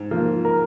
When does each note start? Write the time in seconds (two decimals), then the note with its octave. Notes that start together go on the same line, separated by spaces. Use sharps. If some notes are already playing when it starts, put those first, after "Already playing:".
Already playing: G#2
0.11 F3 A#3
0.45 A#4